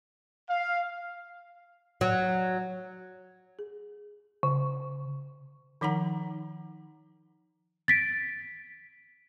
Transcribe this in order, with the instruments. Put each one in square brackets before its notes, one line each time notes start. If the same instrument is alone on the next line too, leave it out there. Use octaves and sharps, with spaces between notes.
[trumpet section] F5
[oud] F#3
[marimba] G#4
C#3
[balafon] D#3 F3 D#4 F#5 A#5
[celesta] A6 B6 D7